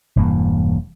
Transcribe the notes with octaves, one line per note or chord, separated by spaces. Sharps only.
E1 G2 E3 A#3